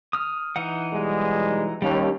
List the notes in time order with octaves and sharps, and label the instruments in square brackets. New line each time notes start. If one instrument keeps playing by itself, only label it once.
[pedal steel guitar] D#6 F6
E3 D#4 F#5
[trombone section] B1 G3 G#3
[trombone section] D#2 [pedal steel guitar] G3 C#4